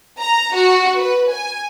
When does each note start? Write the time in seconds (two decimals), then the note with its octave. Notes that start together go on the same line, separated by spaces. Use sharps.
0.20 A#5
0.54 F#4
0.98 B4
1.34 G#5